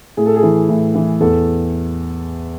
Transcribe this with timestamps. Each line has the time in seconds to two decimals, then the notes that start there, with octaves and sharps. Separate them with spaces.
0.17 A2 G#4
0.26 A4
0.36 G#4
0.43 E3
0.69 A2
0.95 E3
1.20 E2 A4